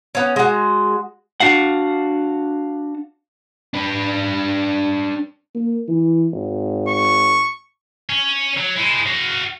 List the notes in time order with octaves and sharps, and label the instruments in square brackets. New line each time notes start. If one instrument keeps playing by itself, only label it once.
[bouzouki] B3 C#4
G#3 F#4
[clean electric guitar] D4 F#4 F5 F#5
[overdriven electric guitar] D4 B4
[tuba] A#3
E3
G#1
[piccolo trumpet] C#6
[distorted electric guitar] C#4
F#3
G#3 E4
F#4 F5